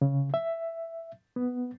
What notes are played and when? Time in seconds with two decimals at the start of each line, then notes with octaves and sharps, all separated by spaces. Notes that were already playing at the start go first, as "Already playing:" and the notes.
0.01 C#3
0.34 E5
1.36 B3